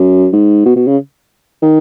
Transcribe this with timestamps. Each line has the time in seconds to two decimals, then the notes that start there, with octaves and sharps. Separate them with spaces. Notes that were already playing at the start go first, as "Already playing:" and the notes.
Already playing: F#2
0.33 G#2
0.65 B2
0.76 B2
0.87 C#3
1.62 D#3